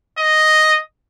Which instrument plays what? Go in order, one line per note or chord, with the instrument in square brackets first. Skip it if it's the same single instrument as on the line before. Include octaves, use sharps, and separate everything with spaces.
[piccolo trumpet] D#5